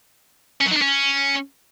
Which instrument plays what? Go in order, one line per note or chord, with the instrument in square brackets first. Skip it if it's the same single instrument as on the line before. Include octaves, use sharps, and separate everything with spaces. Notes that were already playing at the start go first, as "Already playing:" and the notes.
[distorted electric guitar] C#4
F#3
D#4
D4
C#4